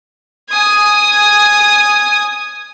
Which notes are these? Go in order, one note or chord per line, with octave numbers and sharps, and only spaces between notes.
G#5 D#6